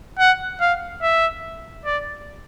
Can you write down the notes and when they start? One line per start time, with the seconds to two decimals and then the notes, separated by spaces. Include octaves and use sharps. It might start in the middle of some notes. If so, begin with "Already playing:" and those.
0.19 F#5
0.61 F5
1.02 E5
1.85 D5